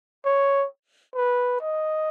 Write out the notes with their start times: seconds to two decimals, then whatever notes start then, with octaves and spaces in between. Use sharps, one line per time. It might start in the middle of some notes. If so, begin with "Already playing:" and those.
0.25 C#5
1.16 B4
1.61 D#5